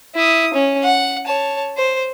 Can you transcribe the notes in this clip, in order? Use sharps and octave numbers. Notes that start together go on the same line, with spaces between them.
E4 D#6
C#4
F#5
C#5 A5
C5